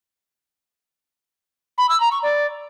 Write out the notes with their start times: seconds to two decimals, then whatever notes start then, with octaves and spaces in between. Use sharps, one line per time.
1.78 B5
1.89 E6
2.00 A#5
2.11 C#6
2.23 D5